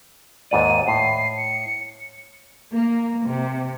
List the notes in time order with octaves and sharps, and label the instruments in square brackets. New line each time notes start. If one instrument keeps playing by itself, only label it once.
[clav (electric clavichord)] D#2 G#2 D5 [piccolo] D#7
[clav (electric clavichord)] A2 [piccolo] C7
[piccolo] C#7
[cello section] A#3
C3